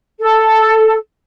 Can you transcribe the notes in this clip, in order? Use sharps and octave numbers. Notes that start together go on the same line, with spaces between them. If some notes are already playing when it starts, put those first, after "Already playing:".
A4